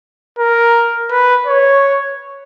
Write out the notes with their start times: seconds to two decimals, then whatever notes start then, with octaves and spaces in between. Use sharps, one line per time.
0.39 A#4
1.10 B4
1.46 C#5